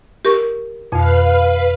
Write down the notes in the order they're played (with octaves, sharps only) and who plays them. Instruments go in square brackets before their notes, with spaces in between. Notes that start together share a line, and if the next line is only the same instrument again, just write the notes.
[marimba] G4 A#4 C#6
[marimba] F2 B2 [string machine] B4 F5